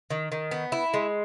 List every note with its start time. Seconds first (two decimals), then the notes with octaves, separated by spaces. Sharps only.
0.10 D#3
0.32 D#3
0.51 B3
0.72 E4
0.94 G#3